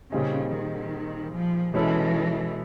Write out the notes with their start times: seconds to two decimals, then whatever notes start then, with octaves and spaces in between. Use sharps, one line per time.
0.12 A#2 C#3 G3 C4 D#4 G#4
0.53 D#3
1.33 F3
1.74 B2 E3 G#3 C#4 E4 A4